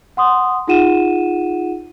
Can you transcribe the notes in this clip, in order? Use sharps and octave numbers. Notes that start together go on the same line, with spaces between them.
F#5 C6 D#6
D#4 F4 G#4 F#5 D#7 E7